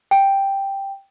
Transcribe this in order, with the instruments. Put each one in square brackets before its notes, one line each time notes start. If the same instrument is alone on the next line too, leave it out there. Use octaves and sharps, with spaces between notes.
[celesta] G5